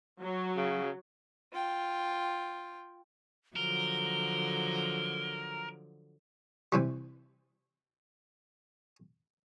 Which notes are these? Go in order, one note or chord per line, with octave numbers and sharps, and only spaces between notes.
F#3
C#3
F4 G5
D3 F3 F#3 A#4 G7
C3 E3 G3